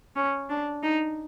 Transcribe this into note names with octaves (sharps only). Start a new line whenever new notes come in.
C#4
D4
D#4